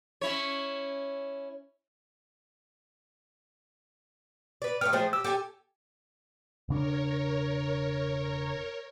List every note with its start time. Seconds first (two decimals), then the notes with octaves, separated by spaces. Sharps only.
0.21 C#4 E4 C#5
4.62 B4 D5
4.81 A3 B3 G4 F6
4.93 F3 A3 G#4 C5 G5
5.13 G4 E6
5.24 G4 A4 G#5
6.69 E1 C#3 D4 A#4 C#5